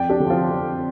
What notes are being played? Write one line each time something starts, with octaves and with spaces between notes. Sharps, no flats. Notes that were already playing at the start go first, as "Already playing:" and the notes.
Already playing: F2 D5 G5
D4 G4
D3
F3 C4 F4
F2